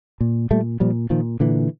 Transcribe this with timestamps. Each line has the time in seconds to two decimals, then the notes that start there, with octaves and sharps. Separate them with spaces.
0.21 A#2
0.51 A#2 G3 A3
0.80 A#2 F3 G3
1.10 A#2 D#3 F3
1.40 A#2 D3 E3